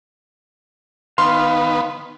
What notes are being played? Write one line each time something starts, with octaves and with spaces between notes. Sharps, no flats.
D#3 B3 B4 F5 C6